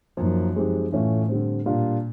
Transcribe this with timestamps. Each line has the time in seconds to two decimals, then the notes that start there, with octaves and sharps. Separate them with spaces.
0.17 F#2 F3 A#3 D#4
0.55 F3 G#3 C4 D#4 G4
0.92 A2 E3 A3 C#4 F4
1.29 D3 G3 C4
1.66 A#2 G3 A#3 D4 F4